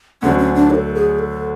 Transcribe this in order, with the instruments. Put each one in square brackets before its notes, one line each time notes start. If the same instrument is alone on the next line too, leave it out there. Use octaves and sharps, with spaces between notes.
[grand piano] D2 D3 F#3 [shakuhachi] C#4
[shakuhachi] C#4
D4
C#5
A4
G#4
A4